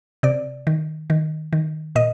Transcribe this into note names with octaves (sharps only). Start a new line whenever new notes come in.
C3 D5
D#3
D#3
D#3
A#2 D#5